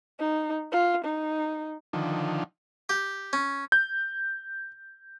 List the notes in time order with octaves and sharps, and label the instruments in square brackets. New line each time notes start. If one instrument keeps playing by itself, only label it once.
[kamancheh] D#4
F4
D#4
[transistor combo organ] D3 D#3 F3
[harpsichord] G4
C#4
[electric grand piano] G6